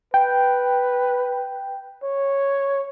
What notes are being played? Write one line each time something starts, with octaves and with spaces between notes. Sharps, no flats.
B4 G5
C#5